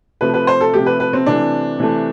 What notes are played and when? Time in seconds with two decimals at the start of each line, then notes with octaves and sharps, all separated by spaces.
0.21 C3 F3 A3 B4
0.34 B4
0.47 C5
0.61 A4
0.74 C3 F3 A3 G4
0.86 B4
1.00 B4
1.13 C4
1.26 C3 E3 A3 D4
1.79 C3 E3 A3